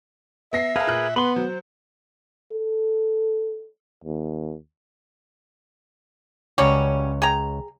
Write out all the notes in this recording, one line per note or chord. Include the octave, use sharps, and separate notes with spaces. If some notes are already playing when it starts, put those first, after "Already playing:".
B3 E5 A#6 C7
G#4 A#4 B4 F5 A5
A#2 F#6
B3 B4 B5 C6
F#3 C5
A4
D#2
C#2 F#3 G3 C#4 C#5
G#4 G5 A#5